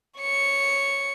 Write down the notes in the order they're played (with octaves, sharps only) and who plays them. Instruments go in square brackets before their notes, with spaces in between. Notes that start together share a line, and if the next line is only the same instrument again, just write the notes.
[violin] C#5 C#7